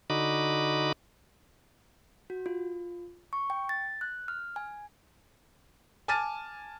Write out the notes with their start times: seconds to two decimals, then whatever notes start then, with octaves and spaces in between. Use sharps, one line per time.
0.10 D3 D#4 F#4 D#5 B5 D6
2.30 F#4
2.46 F4
3.33 C#6
3.50 G5
3.69 A6
4.01 F#6
4.28 F6
4.56 G#5
6.08 G#5 A5 D6 F6 A6 D#7